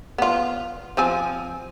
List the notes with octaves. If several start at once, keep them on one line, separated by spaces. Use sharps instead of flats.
B3 F4
F3 C4 G#5